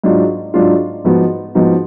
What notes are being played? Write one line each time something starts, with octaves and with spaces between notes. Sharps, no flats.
G#2 F#3 D4 F4
G#2 F#3 D4 F4
G#2 F3 B3 D#4 F#4
G#2 F3 B3 D#4 F#4